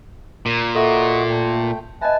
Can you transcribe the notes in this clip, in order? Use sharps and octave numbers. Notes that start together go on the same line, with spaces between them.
A#2 A#4
F#4 A4 D#5 E5
A3 G5
B4 D#5 E5 G#5 A5